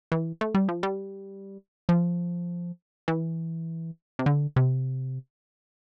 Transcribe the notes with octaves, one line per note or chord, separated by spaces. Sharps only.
E3
A3
G3
F3
G3
F3
E3
C3
D3
C3